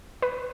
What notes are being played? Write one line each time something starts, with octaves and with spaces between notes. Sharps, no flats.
B4